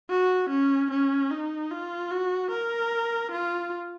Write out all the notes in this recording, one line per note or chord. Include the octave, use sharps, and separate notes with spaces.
F#4
C#4
C#4
D#4
F4
F#4
A#4
F4